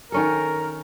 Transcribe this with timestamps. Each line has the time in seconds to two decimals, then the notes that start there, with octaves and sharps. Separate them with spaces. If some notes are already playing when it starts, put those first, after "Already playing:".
0.12 D#3 C#4 A4 A#4